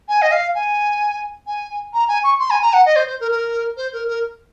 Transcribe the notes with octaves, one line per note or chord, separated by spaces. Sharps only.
G#5
D#5
F5
G#5
G#5
A#5
G#5
C#6
C6
G#5
A#5
F#5
D#5
C5
C5
A#4
A#4
C5
A#4
A#4